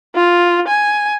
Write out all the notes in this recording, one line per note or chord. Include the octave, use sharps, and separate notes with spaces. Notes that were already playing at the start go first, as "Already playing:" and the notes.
F4
G#5